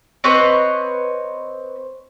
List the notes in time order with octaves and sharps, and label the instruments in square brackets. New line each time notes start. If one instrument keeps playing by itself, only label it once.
[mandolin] C4 B4 C#5 D#5